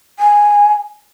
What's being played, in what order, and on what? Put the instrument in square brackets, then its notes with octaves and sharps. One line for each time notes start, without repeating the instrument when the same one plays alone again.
[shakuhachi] G#5